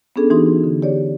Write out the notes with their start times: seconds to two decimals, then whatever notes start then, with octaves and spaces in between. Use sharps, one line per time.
0.16 B3 C#4 D4 G#4 A4
0.30 E3 D#4 F#4 G4 C6
0.64 D3
0.82 G4 C#5 D5